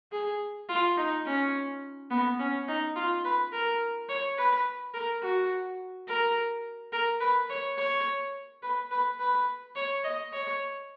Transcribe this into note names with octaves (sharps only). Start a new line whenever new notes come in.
G#4
F4
D#4
C#4
B3
C#4
D#4
F4
B4
A#4
C#5
B4
A#4
F#4
A#4
A#4
B4
C#5
C#5
B4
B4
B4
C#5
D#5
C#5